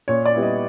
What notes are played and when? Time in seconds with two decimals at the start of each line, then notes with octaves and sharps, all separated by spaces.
0.08 A#2 C#5
0.26 D5
0.34 G3 B3 E4
0.43 D#5